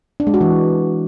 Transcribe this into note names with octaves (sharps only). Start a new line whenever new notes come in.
D4
G#3
F#4
E3